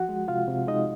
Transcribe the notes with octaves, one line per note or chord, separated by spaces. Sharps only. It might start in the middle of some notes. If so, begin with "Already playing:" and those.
Already playing: F3 F#4 F#5
G#3
C3 F4 F5
C3
G#3 D#4 D#5